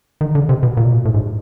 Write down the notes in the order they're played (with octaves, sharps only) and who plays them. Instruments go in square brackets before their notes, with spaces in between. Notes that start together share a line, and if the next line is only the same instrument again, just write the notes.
[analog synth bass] D#3
D3
C3
B2
A#2
B2
A#2
A2
G#2